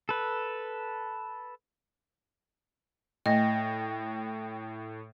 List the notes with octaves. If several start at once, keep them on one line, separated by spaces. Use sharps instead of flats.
A4 B4
A2 A3 D#5 G5 A#6